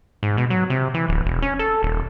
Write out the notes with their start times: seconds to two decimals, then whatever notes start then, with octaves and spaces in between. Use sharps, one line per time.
0.23 G#2
0.37 B2
0.50 F#3
0.70 C3
0.94 E3
1.08 D1
1.25 E1
1.42 C#4
1.59 A4
1.83 D#1